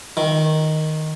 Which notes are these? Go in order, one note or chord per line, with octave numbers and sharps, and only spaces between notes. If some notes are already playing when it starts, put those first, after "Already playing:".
D#3